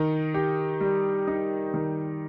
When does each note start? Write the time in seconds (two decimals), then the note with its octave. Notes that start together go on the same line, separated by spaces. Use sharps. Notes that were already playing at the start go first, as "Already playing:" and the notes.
Already playing: D#3 D#4
0.34 G4
0.81 G3
1.28 D#4
1.74 D#3